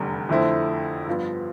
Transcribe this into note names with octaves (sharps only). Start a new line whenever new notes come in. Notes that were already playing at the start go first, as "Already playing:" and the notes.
Already playing: F1 E2 D3 G3
F2 D3 A3 C4 E4
G2 F3 B3